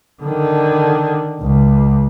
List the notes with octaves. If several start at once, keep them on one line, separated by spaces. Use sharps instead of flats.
D3 D#3
C#2